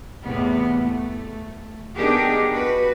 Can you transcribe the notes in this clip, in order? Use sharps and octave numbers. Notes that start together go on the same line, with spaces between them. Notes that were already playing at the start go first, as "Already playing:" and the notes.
E2 A2 C3 B3
A3
B3 D4 D#4 G4 G#4 A#4
F#4 B4